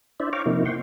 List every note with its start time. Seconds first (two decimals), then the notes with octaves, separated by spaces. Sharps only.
0.20 D4 E4 C5 D5 E5
0.33 C#5 F5 G5 A#5 C#6 D6
0.46 C3 F3 A#3 D#4 E4
0.65 F#5 G5 C6 C#6